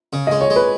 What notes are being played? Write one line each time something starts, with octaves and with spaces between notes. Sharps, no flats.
C#3
G#3 D#5
C#5
G#3
B4